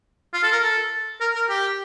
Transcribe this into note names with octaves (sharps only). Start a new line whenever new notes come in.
F4
A4
A#4
A4
A#4
A#4
G4